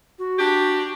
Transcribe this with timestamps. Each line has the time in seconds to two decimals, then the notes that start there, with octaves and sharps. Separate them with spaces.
0.19 F#4
0.39 D4 G4